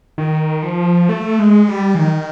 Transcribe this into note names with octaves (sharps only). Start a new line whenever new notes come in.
D#3
F3
A3
G#3
G3
E3
D#3